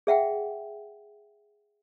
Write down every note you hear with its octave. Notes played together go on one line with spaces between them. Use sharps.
G#4 E5 F#5 G5